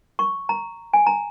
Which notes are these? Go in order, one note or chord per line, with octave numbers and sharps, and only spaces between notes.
C#6
A#5
G#5
A#5